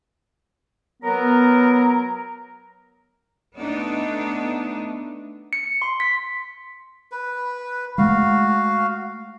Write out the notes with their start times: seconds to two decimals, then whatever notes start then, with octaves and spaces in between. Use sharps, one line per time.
1.03 F#3 B3 A#4 A#5
3.57 A3 B3 D4 D#4
5.53 C#7
5.82 C6
6.00 B6
7.12 B4
7.98 G#3 A3 F#4 F5